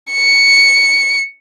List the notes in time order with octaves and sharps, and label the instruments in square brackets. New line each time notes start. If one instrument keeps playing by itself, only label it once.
[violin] C#7